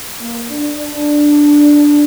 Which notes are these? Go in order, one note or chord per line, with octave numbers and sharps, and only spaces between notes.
A#3
D4
D4